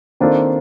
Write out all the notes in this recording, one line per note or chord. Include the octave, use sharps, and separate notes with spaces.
D#3 A#3 C4 D4 F4 A4